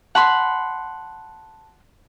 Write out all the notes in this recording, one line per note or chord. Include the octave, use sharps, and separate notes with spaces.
F#5 A5 B5 C6